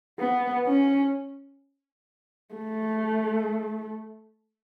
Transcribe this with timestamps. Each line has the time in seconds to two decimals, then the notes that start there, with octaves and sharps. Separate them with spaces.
0.20 B3
0.67 C#4
2.55 A3